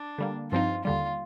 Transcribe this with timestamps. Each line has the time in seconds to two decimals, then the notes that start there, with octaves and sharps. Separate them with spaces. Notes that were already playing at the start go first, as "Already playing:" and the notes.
Already playing: D4
0.18 D3 G3 A#3
0.51 G2 F3 C4 D#4 F4
0.84 D#2 D3 G3 F4